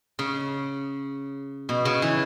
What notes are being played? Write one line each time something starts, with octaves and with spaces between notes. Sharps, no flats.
C#3
B2
C#3
E3